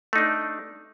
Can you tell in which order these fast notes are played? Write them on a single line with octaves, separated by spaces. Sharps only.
A3 D#4 D4